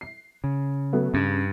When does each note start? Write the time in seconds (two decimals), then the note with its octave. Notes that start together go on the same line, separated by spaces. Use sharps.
0.01 C7
0.44 C#3
0.93 F#3 A3 B3
1.14 G2 C#3